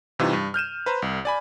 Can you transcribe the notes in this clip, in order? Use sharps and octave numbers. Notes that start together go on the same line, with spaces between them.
G2 C3 E3 D#4 F4
G2
F6 G6 D#7 E7
B4 C5 A#5
C2
D5 G#5 B5